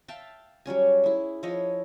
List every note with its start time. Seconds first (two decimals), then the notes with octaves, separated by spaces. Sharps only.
0.08 E5 F5 G5 A5
0.66 F#3 G3 C#4 G#5
1.04 E4 G#4
1.43 F3 E4 C#5 D#5